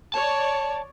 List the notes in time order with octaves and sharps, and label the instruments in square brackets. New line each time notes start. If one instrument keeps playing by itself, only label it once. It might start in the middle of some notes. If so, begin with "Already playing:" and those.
[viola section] C#5 D5 [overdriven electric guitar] A5